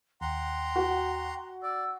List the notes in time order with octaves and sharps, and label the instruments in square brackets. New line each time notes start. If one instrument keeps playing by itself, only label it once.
[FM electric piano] D#2 [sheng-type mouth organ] F#5 A#5 C6 [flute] G5
[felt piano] F#4
[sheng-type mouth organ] D5 [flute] E6